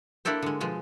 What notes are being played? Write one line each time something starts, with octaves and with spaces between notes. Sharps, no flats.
A#3 D4 E4 G4 A4 C5
D3 G#3
B2 F3 G#3